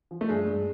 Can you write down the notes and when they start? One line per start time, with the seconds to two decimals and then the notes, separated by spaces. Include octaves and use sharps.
0.11 F3
0.21 A3
0.28 G2 G#3
0.47 G2